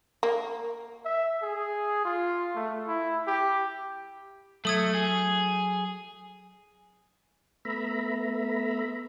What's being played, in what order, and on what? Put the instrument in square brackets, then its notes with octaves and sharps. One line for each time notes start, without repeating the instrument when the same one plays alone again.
[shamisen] A#3
[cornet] E5
G#4
F4
A3
E4
G4
[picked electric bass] F#3 [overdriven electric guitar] A3 [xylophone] A4 D#6 G#6
[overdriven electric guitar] G#4
[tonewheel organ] A3 B3 E5 A#5 B5